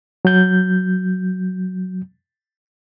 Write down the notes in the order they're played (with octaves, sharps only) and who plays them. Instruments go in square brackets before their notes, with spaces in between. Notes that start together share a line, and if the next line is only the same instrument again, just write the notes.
[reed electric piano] F#3 G6